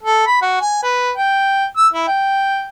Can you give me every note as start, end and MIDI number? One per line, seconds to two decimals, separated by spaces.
0.03 0.25 69
0.27 0.41 83
0.42 0.58 66
0.61 0.82 80
0.83 1.11 71
1.17 1.65 79
1.77 1.87 88
1.93 2.07 64
2.08 2.69 79